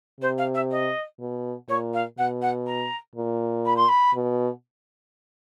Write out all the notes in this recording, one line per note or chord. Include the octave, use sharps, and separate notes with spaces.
C3 C5
F5
E5
D#5
B2
A#2 C#5
F5
B2 F#5
F#5
A#5
A#2
B5
C6
B5
B2